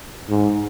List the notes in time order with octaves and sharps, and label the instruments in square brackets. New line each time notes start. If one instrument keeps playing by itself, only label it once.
[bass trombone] G#2